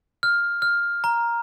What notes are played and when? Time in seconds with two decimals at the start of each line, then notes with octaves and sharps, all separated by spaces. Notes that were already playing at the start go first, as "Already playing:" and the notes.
0.23 F6
0.62 F6
1.04 A#5